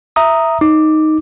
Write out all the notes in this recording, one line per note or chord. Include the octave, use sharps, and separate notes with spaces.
E5 A#5 D#6
D#4 D6